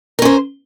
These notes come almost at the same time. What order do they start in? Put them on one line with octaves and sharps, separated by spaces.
A#4 C#4 C5